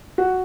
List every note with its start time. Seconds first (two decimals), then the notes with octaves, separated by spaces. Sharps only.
0.18 F#4 F#5